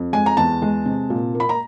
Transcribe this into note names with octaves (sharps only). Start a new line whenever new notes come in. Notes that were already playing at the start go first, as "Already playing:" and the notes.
Already playing: F2
G#3 G#5
A#5
E2 A5
G#3
C3
A#2
A#3
B5
A#5